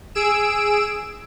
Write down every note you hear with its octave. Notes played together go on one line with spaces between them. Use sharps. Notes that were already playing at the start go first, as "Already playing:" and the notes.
G#4 E6 D7 E7